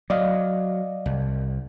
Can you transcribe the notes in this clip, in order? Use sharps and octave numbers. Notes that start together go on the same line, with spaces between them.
F#3 D5 D#5 F5
C2